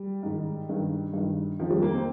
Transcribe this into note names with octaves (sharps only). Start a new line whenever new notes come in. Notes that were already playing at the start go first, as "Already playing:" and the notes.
Already playing: G3
G#2 D#3
G2 D#3
G2 D#3
F2 D#3 F3
G3
A#3
C4